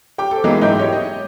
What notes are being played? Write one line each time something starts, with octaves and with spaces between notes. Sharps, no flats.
G4 G5 D6
A4 C5
E3 F#3 G#3 A#3 B3 D#4
G#2 D#4 E4 G5 D6 G6
G4 C#5
D#5